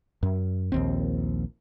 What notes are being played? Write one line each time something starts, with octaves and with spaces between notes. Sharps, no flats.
F#2
A#1 D#2 C4